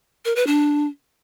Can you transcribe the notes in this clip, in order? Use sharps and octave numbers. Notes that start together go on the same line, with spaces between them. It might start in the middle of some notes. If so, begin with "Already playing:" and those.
A#4
B4
D4